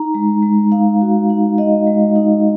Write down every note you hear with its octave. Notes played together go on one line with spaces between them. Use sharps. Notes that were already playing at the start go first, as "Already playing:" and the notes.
Already playing: D#4 A#5
G#3
G#3
D#4 F5
F#4
D#4
D#4 D#5
G#3
D#4